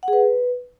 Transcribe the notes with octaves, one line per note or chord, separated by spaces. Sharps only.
F#5
G#4
B4